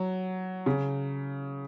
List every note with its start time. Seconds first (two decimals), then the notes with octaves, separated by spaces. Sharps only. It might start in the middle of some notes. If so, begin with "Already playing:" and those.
Already playing: F#3
0.66 C#3